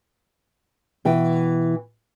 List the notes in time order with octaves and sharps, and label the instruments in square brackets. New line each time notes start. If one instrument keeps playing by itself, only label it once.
[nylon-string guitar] B2 E3 G5